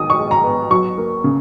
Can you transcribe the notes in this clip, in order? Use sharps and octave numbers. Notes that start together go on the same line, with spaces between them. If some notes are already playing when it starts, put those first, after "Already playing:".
Already playing: D#3 D#4 D#6
C#6
G#3
A#5
B3
F#3 C#6
A#3
C#3